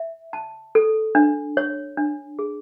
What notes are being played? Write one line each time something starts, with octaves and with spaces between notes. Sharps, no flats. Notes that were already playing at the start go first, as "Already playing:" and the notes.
Already playing: E5
A5
A4
D4
C#5
D4
G#4